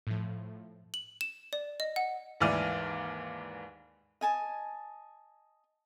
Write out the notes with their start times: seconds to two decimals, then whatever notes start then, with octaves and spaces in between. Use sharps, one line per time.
0.07 A2 F3
0.94 F#7
1.21 E7
1.53 D5
1.80 D#5
1.96 F#5
2.40 D#2 G#2 E3 D5 F6 D#7
4.21 D#5 G#5 A5